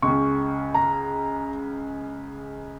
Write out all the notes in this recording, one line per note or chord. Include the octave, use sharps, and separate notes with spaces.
C#2 C#3 C#6
A#5